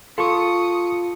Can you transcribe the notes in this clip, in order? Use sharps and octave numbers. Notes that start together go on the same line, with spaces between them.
F4 A4 C6 C#6 D#6 C#7